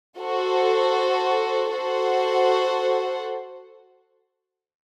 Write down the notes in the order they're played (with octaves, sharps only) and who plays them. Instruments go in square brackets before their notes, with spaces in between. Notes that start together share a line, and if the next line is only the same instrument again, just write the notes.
[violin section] F#4 A4 C5
F#4 A4 C5 F#5